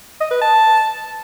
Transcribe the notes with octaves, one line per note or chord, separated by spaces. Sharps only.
D#5
B4
A5